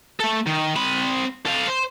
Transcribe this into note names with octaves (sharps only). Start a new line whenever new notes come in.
A3 A4
D#3
C4 B5
A4 F5
C5